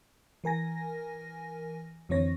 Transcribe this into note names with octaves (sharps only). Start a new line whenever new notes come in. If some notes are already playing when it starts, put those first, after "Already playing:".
E3 A#4 G#5 A#6
F2 D3 E3 C4 C#5 A#6